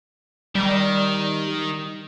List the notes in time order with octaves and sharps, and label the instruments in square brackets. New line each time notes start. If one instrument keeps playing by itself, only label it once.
[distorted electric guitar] D#3 [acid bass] G3